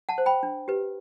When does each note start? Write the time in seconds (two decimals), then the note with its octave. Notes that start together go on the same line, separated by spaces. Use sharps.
0.09 F#5 A5
0.18 C5
0.26 G5 B5
0.43 D4
0.68 G4 B4